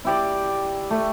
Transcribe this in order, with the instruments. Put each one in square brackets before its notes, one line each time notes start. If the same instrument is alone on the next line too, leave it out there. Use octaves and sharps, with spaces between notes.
[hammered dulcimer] E4 G4 D5
A3